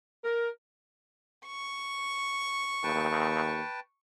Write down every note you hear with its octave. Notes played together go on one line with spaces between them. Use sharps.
A#4
C#6
D#2 B4 G5 A5